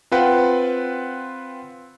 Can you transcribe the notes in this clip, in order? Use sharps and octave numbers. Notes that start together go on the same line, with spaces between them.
C4 F4 B4 F#5 G5